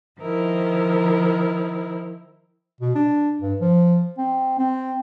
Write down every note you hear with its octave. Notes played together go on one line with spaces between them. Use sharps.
D#3 F3 E4 A#4 C5
B2
D4
G2
F3
C4
C4